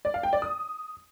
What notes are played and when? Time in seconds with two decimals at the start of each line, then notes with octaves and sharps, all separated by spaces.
0.05 D5
0.14 F5
0.23 G5
0.33 D5
0.42 D#6